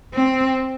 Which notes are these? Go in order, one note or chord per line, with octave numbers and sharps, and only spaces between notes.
C4